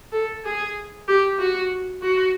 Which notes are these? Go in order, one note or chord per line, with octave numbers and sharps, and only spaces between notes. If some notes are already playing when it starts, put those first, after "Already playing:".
A4
G#4
G4
F#4
F#4